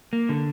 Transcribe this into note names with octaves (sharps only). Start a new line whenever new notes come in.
A#3
D3